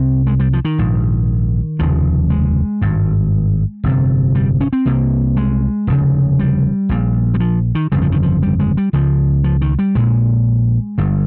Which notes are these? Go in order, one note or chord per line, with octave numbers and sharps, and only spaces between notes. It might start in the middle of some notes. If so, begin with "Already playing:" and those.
Already playing: C2 C3 C4
G#3
G3
F3
D#3
A#1 G#2
F1 D#2 C#3 F3
G#3
G#1 G2
G1 F2 C3
G3
C#4
C4
C2 C3 A#3
G#3
F1 D#2 C#3
G3
A#1 A#2
G3
F3
D#3
G1 F2 C#3 G3
F3
D#3
F3
G3
G#3
G3
C#2 C#3 F3
F3
D#3
G3
A#1 A#2 G#3
G1 G2